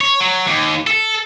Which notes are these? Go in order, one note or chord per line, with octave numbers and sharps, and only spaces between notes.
C#5
F#3
D#2
A4